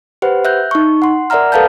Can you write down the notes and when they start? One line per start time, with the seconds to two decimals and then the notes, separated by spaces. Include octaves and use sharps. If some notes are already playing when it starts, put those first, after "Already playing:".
0.22 G4 B4 C5 F#5
0.45 E5 F#6 G6
0.71 D#4 C#6
1.02 F#5 C6
1.30 A#4 D5 E5 F#5 A#5 F6
1.52 A4 B4 F5 A5 G6